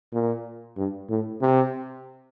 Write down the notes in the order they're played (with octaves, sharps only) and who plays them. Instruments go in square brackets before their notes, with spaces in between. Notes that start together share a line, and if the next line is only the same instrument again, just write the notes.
[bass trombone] A#2
G2
A2
C3